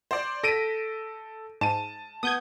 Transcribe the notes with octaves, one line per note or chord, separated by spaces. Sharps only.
C5 D5
A4 A#6 B6 D7 D#7
G#2 A5 D#7 E7
B3 D#6 G6 G#6